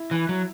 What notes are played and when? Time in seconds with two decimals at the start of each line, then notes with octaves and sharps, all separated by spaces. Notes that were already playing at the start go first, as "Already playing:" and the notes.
Already playing: E4
0.11 E3
0.29 F#3